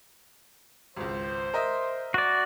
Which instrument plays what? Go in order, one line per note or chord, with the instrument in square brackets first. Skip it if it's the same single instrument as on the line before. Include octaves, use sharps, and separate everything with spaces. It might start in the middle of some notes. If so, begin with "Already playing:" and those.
[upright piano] G#1 C#2 [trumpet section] C5
[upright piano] A#4 D#5 E5
[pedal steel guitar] F#4 D5